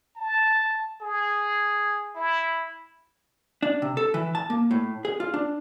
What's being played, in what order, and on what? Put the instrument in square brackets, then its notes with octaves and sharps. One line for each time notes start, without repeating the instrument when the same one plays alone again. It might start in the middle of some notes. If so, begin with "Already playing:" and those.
[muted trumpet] A5
G#4
E4
[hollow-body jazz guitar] D4
C3
A4
E3
A5
A#3
A2
G#4
F4
D4